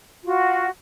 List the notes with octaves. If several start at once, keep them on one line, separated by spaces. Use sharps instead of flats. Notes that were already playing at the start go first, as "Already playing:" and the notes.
F4 F#4